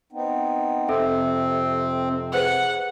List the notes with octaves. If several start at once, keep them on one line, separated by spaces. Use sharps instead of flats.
B3 C4 D#4
F2 C3 C4 A4 E5
G#4 B4 C5 F#5